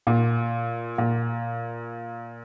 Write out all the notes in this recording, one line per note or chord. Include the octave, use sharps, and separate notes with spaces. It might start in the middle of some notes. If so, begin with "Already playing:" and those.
A#2
A#2